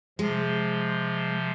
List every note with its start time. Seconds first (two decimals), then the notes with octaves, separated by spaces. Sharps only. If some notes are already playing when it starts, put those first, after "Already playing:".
0.19 C3 F3 G#3